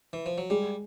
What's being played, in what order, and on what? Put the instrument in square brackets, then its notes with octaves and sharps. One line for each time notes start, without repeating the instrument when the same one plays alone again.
[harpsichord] E3
F3
F#3
[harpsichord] G3 [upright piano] G#3